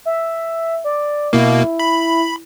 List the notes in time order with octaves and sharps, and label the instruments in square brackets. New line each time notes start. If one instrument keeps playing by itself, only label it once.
[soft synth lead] E5
D5
[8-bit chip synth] B2 A#3 [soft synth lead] E4
[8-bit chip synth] B5